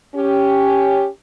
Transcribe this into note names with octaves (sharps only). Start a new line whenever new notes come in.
C#4 G4